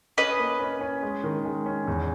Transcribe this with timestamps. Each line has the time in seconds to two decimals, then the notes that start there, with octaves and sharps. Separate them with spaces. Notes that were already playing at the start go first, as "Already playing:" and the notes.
0.17 C#4 B4 D#5
0.39 A#3
0.60 C#4
0.81 C#4
1.02 G#3
1.24 D#3
1.45 G#3
1.66 C#4
1.87 E2